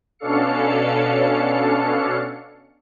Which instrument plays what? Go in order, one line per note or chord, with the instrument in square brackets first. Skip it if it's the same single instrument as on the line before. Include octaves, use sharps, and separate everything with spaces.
[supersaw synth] B2 C#4 D4 A4 F5 C#7